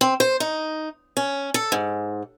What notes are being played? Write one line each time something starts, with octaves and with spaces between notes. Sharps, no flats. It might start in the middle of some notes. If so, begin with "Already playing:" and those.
C4
C5
D#4
C#4
A4
G#2